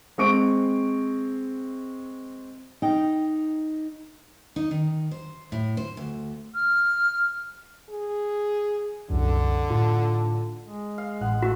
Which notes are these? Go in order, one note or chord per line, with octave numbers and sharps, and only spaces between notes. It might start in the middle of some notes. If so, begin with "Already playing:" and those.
G#3 C4 C#6 D7
D#4 G5
D#4
D#3
C5
A2
C5
D2
F6
G#4
C2 F#2 D3
A2 F4 A5
G#3
F5
A1 F#5
A3 F#4